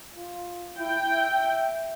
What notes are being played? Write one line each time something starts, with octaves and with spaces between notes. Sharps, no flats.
F4
E4 G5
E5